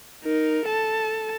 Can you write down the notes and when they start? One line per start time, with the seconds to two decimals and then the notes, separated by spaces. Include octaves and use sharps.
0.24 D#4 A#4
0.66 A4 A5